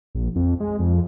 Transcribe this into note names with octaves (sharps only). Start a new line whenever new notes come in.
A#1
F2
G#3
F2